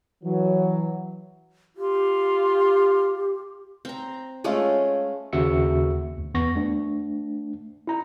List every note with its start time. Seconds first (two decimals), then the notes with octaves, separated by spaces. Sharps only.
0.24 E3 F#3
1.77 F4 G4
3.85 C4 A#5
4.44 G#3 A3 C#4 F4
5.33 D#2 C#3 F#4 E5 E6 C#7
6.18 D2
6.34 E2 B3 C#6 A#6
6.56 A3 D4
7.87 E4 A#5